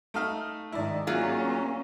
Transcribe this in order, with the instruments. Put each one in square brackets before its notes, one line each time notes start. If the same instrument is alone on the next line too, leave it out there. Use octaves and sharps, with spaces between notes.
[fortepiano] A3 D#4 F5
[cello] G#2 D#3 [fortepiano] E4 D5
[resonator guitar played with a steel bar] F#3 F4 G#4 [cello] A#3 C#4